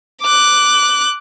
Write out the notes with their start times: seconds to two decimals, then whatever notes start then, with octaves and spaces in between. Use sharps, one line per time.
0.22 D6 F#6